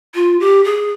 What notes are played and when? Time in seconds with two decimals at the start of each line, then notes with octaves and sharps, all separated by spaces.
0.15 F4
0.40 G4
0.64 G#4